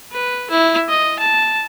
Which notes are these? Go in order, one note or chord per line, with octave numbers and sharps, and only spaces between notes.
B4
E4
D#5
A5